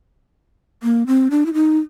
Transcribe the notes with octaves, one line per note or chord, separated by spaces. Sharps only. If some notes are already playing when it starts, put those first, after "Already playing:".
A#3
C4
D4
E4
D#4